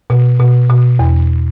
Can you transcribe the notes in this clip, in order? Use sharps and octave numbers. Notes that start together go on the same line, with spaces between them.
B2
B2
B2
E2